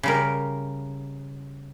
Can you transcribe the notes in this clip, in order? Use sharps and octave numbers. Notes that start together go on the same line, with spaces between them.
C#3 G3 A#4